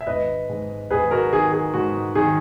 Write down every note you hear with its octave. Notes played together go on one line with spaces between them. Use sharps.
E5
G#1 B4 D#5
G#2
G#1 G#4 B4
F#4 A#4
D#3 G#4
G#4
G#2 F#4
D#3 G#4